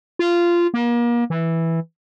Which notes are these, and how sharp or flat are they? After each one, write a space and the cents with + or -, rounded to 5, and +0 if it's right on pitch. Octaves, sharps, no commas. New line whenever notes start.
F4 -15
A#3 +35
E3 -5